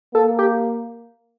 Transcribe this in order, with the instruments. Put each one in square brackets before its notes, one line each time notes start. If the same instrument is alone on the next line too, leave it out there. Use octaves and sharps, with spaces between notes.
[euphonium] A#3 [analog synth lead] A4
[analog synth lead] G4